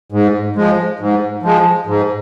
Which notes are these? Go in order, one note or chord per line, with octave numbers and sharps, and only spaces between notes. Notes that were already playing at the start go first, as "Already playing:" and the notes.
G#2
F3 G#3
G#2
F3 G#3
G#2